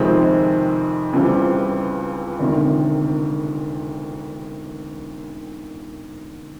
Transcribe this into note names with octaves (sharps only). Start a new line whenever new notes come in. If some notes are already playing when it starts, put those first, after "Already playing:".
Already playing: F2 C3 D#3 G#3 C4
C#2 C#3 E3 G3 C4
E1 D2 C3 D#3